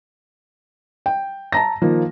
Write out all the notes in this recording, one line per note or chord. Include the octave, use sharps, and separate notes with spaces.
G5
A5 A#5 A#6
D#3 F3 A#3